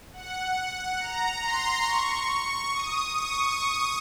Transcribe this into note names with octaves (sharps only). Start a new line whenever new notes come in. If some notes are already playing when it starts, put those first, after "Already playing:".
F#5
A#5
C6
C#6
D#6
C#6